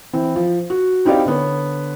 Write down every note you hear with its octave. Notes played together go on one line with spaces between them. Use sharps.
E3 C4
F3
F#4
C4 D#4 E4 G4 D5 F5
D3 B3 C#5